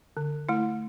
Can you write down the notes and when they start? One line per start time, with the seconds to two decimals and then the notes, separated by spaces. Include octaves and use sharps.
0.17 D3
0.49 A3 E4